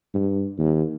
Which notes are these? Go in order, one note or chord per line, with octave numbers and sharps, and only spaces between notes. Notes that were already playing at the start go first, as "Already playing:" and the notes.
G2
D#2